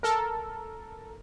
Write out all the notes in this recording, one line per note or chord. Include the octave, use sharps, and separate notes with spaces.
A4 A#4